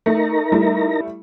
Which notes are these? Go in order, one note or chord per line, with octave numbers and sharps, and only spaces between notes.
A3 D#4 A#4 A#5
G3 A3 E4